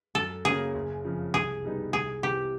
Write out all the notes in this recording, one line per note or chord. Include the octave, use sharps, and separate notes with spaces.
F#2 A4
C#3 F#3 A#3 C#4 G#4
F#1
F2 C#3 F3
C2 G#4
B2 G3 B3 D#4
C2 G#4
C3 E3 G4